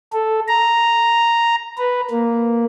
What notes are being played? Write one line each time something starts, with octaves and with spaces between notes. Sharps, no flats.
A4
A#5
B4
A#3